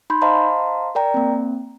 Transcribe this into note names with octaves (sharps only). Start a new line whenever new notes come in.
D#4 B5 C6 G6
C5 D#5 F5 A5 A#5 C6
A#4 D5 G5 A#5
A#3 C4